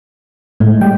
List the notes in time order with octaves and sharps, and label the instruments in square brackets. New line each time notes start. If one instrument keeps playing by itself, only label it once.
[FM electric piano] A2 [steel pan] G#3 A3
[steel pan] G3 [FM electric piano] G5